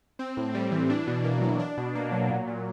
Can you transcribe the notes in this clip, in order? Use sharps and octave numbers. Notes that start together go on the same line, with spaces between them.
C4
A2
G3
E3
D4
B2
A#3
F#3
D4
B2
A#3
F#3
A#2
A#2